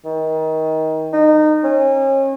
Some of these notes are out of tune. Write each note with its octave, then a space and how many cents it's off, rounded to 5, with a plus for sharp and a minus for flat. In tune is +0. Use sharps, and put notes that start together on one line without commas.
D#3 +25
D#4 -25
C#4 -35